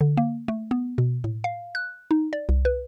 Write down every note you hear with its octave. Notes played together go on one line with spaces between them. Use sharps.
D3
A#3
A3
B3
B2
A2
F5
F#6
D#4
D5
C2
B4